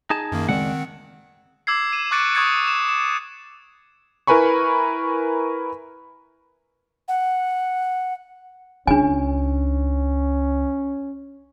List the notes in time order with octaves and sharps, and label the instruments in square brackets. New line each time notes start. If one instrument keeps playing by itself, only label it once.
[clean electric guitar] D#4 G#4 A5
[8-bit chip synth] F#2 D#3 A#3
[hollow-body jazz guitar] C#2 G#3 D5 [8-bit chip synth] D#3 C4 [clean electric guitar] F#5
[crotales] D6 E6 G#6 C7
D#7 E7
C#6 D6 F#6 A6 C#7 D7
C#6 D#6 G#6 A6 C#7
E7
E7
[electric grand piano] E4 A#4 B4 G#5 B5 C#6
[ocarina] F#5
[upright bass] C#2 [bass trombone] C#4 [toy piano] D4 G#5